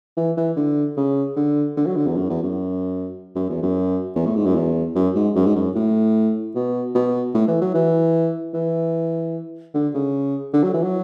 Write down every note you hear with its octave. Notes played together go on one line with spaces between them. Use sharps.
E3
E3
D3
C#3
D3
D3
F#3
D3
E2
F#2
E2
F#2
F#2
E2
F#2
E2
A2
G#2
F#2
E2
F#2
G#2
F#2
G#2
F#2
A2
B2
B2
A2
E3
F#3
E3
E3
D3
C#3
D3
F#3
E3
F#3